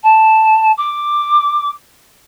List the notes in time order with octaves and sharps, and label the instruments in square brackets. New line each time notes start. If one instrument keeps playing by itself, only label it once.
[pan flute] A5
D6